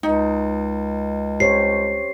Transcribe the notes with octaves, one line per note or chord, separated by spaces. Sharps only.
C#2 D#4
G4 C5 C#5 C7